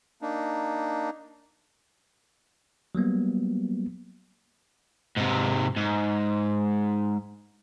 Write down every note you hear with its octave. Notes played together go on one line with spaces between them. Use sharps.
A#3 D4 D#4
F#3 G3 A#3 B3
G#2 C3
G#2